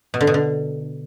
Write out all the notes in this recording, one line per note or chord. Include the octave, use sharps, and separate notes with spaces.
B2
D3
B2
D3